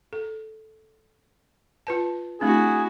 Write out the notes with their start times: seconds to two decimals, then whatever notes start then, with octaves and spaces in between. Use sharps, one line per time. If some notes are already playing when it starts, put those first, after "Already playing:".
0.13 A4
1.87 F4 B4 A5
2.41 A3 C4 D4 E4 F#4 G#4